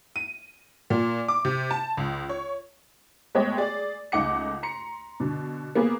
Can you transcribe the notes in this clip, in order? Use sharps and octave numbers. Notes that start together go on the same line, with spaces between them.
D#7
A#2
D6
C3
A5
C#2
C#5
G#3 A3 B3 C#5 D#5 G5
G#4 D5
C#2 A3 D#4 F#5 D6 C#7
A#5 C6 C#7
B2 D3
A#3 B3 G#4